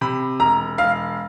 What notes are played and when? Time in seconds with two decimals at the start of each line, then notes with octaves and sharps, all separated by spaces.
0.01 C3 B5
0.40 E1 A#5
0.78 E1 F5